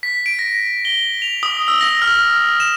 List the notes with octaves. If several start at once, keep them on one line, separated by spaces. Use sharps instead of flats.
B6
D7
A#6
G7
F7
D#6
E6
A#6
F6
E7